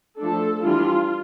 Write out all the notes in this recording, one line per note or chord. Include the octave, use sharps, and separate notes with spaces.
F3 A3 D4 A4
E3 G3 D4 F4